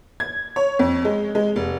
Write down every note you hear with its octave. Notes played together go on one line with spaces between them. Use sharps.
G#6
C#5
F2
G#3
G#3
F1